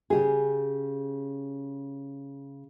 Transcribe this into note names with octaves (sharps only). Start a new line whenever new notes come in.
C#3 G4 G#4